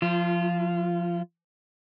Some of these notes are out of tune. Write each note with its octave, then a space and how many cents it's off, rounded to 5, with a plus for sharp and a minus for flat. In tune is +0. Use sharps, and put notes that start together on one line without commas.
F3 +5 F4 -25